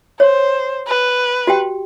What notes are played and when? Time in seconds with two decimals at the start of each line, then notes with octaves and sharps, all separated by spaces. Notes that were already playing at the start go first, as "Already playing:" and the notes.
0.20 C5 C#5
0.88 B4
1.47 F#4 G4 G5